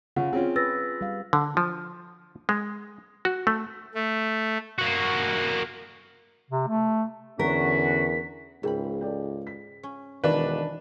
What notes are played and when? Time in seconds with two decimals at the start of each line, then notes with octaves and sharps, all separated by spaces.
0.16 C#3 F4 F#5
0.33 C4 C#4 F4 G#4
0.56 B4 E6 A6 A#6
1.01 G3 F5
1.33 D3
1.57 F3
2.49 G#3
3.25 F#4
3.47 A3
3.95 A3
4.79 A#3 F#4
6.50 C3
6.68 A3
7.39 E2 D3 C#4 F#4 A#4 B6
8.63 C#2 G#2 G#4 A#4 G5 B5
9.01 A4 D5 G5
9.47 B6
9.83 C#4
10.24 E1 D#3 E3 D4 B4